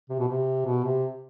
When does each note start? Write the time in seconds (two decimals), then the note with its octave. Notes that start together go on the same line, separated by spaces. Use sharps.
0.10 C3
0.19 B2
0.28 C3
0.66 B2
0.85 C3